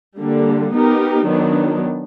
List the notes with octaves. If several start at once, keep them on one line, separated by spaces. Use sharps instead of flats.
D3 G3 A#3
B3 D#4 G4 A#4
D#3 F#3 B3 D4